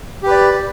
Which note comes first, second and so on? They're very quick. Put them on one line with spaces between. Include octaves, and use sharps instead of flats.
G4 B4 D5